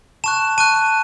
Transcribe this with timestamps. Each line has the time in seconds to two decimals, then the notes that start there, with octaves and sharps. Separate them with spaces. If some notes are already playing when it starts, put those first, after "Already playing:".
0.24 A5 C#6 F#6 E7
0.58 A5 C#6 F#6 D#7